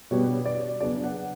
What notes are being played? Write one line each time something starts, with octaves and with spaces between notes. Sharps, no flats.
B2 G3 B3 D4 C#5
D5
C#3 F#3 B3 D4 D5
F#5